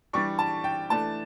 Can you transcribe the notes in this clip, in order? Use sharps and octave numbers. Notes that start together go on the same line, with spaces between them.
E3 G3 D4 C#6
A5
G5
E3 A3 D4 A5